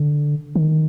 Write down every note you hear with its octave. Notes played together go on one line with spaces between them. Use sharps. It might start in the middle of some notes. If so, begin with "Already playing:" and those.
Already playing: D3
D#3